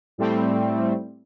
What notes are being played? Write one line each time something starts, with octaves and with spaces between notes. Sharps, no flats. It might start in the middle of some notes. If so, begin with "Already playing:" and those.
A2 G3 A3 C4